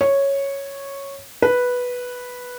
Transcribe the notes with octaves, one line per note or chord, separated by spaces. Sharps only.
C#5
B4